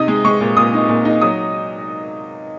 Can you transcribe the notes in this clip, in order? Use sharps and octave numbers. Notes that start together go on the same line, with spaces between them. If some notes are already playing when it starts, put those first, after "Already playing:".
Already playing: C3 D#4 D#6
G#3
G#3 C#6
A#2
A#2 D#6
D#4
A#2
D#4
F#3 D#6